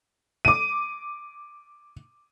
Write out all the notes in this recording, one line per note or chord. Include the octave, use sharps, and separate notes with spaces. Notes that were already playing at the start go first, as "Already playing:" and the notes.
D6 D#7